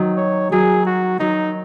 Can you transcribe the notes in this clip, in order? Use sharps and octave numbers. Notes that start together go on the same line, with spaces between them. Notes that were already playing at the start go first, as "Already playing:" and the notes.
Already playing: D#3 F#3
C#5
D#3 F#3 G#4
F#4
D#3 F#3 D#4